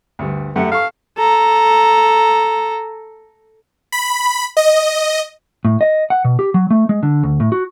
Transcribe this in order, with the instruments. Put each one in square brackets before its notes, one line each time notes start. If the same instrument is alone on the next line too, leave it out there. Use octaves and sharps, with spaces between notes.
[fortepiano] D2 G2
[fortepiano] F#2 G4 F#5 [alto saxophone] A3
[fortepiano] A4 C#6 [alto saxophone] F5
[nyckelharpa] A4 A#5
[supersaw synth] B5
D#5
[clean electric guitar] A2
D#5
F#5
B2
G4
F#3
A3
G#3
D3
D2
A2
F#4